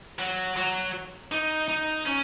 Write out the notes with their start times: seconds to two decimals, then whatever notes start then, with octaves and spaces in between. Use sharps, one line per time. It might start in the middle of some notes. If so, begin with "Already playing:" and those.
0.19 F#3
0.57 F#3
1.32 D#4
1.68 D#4
2.06 C#4